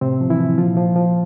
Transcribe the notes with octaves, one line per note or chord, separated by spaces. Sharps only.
A2 C3 C4
F3
E3 E4
F3
A#2 F3 F4
F3
F3